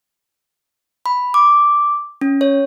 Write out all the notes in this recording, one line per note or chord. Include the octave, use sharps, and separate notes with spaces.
B5
D6
C#4
C#5